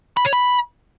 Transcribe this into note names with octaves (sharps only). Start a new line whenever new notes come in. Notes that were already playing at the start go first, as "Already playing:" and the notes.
B5
C#5
B5